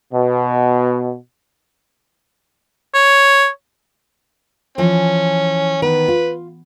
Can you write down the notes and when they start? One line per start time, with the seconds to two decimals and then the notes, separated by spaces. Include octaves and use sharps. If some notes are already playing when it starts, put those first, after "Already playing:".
0.13 B2
2.94 C#5
4.78 E3 F3 C#4
5.82 D#3 B3 B4
6.08 F4